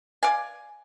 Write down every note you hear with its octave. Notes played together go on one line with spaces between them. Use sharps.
D5 F5 G#5